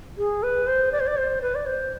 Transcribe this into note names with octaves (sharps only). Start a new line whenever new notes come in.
G#4
B4
C5
D5
C5
D5
C5
B4
D5
C5